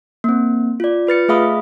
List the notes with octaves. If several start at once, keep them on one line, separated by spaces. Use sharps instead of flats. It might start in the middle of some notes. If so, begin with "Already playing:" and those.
A#3 C4
F4 D5
F4 B4 A6 C#7
A3 G#4 E5 F5 B5 D#6